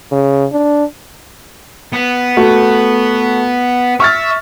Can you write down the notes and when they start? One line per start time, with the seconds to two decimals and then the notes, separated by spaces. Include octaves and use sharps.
0.12 C#3
0.52 D4
1.92 B3
2.37 A3 F#4
4.00 E5 C#6 F6 A6